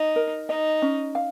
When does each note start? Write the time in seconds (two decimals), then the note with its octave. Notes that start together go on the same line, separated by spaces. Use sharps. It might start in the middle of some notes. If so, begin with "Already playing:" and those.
Already playing: D#4 D#5
0.16 A#4
0.49 D#4 D#5
0.82 C#4
1.15 F5